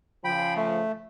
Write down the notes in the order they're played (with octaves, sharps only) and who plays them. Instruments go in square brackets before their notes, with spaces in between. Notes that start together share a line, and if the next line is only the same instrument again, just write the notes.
[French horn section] C#3 F3 [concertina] G5 B5
[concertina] A3